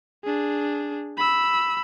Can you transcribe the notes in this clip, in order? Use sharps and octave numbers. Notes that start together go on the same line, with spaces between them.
D4 G#4
B5 E6